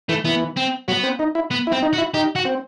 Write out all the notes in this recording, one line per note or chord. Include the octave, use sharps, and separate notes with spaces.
E3 A3
E3 B3
C4
F#3 B3
C4
D#4
E4
B3
E4
C4
D#4
F#4
E4
D#4 G4
F#4
C4